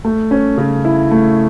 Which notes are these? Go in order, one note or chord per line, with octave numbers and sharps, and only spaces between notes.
A3
C#4
C#3
E4
A3